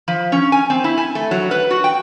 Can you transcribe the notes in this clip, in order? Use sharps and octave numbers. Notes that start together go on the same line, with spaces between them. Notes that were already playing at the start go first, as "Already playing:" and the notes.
F3
C#4
G#5
C4
E4
G#5
A3
F#3
B4
F#4
G5